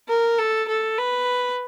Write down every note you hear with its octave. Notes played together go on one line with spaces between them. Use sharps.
A#4
A4
A4
B4